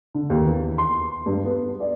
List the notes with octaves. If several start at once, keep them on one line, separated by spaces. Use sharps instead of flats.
D3
D#2
E2
C6
G2
B3
D5